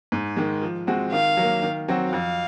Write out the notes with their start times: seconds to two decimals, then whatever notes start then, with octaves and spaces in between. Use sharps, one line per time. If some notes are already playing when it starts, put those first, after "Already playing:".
0.12 G#2
0.37 D#3 G#3
0.62 F3
0.87 G#3 C4 F#4
1.12 D#3 F5
1.37 F#3 A#3
1.62 D#3
1.88 F#3 C4 F#4
2.13 F2 F5